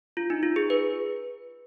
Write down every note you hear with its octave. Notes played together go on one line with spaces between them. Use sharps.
F4
D#4
F4
G#4
B4